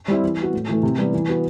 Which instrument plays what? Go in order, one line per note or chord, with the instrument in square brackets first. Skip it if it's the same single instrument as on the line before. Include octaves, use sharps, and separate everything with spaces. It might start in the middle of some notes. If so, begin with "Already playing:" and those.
[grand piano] G3 C4 E4
E3
B3 F#4
A2
E3 A3
C3
E3 G3 B3
E3
B3 F#4